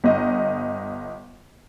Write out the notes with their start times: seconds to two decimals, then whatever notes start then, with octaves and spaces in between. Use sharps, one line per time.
0.04 G1 D#5